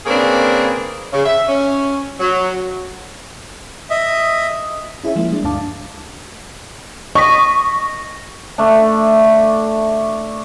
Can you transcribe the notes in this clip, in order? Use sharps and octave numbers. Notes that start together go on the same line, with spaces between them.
C#3 A#3 C4 D4 G#4 B4
C#3
E5
C#4
F#3
D#5 E5
C#4 E4 G#4 C#5 E5
F3 G#3 A#3 E4
G3 G#3 D4
D2 G2 D4 F5 A5 D6
D#5 C#6 B6
A3 D4